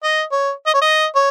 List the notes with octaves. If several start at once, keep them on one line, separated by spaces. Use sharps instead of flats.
D#5
C#5
D#5
C#5
D#5
C#5